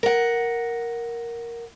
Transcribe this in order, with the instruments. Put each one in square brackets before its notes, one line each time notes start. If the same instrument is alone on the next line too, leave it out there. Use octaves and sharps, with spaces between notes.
[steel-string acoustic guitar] A#4 F#5